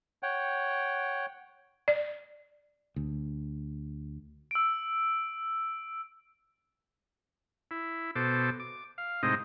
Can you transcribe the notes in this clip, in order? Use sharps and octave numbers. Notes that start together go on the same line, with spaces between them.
C#5 F#5 G5
D5
D2
E6 D7
E4
B2 A4 C5 D6
D6
F5
A2 C3 G#3 C4 D#4 D#5